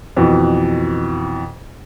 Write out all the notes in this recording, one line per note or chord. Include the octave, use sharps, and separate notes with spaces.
F2 B2 E3